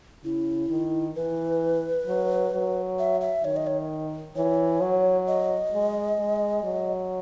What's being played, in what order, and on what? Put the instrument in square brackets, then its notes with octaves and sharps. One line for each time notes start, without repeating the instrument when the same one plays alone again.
[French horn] C#3 [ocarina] E4
[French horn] D#3
[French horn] E3 [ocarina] B4
[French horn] F#3
F#3
[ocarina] E5
E5
[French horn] D#3 [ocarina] C#5
[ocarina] D#5
C#5
[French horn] E3 [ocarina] C#5
[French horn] F#3
[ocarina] D#5
[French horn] G#3
G#3
F#3